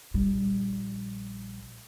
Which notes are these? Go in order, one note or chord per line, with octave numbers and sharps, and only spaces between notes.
A#1 G3